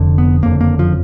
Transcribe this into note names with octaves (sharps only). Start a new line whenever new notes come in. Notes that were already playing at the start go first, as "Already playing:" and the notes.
Already playing: F1 F2 D3
B3
F#1 F2 D3 A#3
A#3
F3